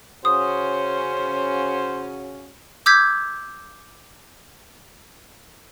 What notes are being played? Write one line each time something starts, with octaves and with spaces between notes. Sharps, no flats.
C#3 C#4 F#4 C5 D#6
D6 E6 G6 G#6 B6